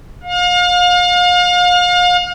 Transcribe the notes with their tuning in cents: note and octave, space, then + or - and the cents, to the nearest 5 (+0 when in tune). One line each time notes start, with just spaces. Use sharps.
F5 +35